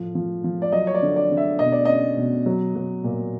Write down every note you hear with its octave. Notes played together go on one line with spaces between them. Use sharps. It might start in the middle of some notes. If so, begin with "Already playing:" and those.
Already playing: A2 F3
F3
F3
D5
F#3 D#5
C#5
D5
D3
D5
D3
E5
B2 D#5
D5
C#4 D#5
B2
F#3
F#3
A#2